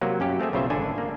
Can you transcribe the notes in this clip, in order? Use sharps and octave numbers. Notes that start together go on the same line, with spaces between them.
C3 F#3 A#3
F#2 C#4 G4
A3 C4 G#4 E5
B1 C#3 F4 C5 E5 G#5
G#1 D3 D4 A4 G#5
A#3